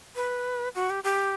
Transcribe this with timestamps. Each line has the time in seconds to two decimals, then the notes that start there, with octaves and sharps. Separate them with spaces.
0.15 B4
0.75 F#4
0.90 G4
1.04 G4